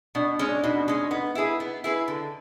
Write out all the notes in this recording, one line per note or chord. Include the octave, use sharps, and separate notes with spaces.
B2 D4
G#3 C#4
D4
B2 D#4
G#3 C#4
B3 D#4
E4 G#4 B4
B3
E4 G#4 B4
D3